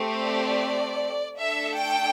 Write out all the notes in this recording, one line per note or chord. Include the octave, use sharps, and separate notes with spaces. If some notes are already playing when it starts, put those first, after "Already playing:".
Already playing: A3 C4 G4
D5
A3 D4 A4 E5
G5